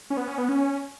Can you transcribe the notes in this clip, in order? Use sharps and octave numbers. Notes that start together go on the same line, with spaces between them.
C#4
B3
C#4
B3
C#4